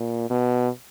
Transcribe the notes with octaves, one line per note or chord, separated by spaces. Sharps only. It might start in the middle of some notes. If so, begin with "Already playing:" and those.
Already playing: A#2
B2